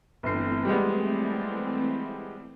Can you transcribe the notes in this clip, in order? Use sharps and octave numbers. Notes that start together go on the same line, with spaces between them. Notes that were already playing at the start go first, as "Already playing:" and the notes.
G1 E3 A3 C4 C7
G3 G#3 B3